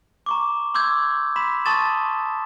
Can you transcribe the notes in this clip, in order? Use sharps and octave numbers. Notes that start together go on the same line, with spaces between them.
A#5 C#6 D6
C6 D6 E6 G6 G#6
B5 C6 B6 E7
A5 C6 C#6 D#6 A6 E7